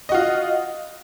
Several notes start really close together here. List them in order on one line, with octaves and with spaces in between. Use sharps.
D#5 F#4 F4